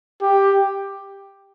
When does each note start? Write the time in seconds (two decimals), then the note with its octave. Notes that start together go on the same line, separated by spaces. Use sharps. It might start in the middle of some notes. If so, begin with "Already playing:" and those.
0.22 G4